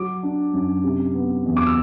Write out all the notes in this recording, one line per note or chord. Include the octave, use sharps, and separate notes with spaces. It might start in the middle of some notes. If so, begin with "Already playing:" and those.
Already playing: F#3 D6
D4
F#2
C3
B3
E2
D6
E6